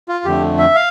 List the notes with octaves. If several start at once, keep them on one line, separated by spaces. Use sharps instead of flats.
F4
F2 D3 A3 G4
E5
F5